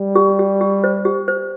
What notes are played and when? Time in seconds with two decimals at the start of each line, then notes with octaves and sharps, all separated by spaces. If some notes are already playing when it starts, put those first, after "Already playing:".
Already playing: G3
0.15 G4
0.39 G4
0.61 G4
0.84 C5
1.05 G4
1.28 C5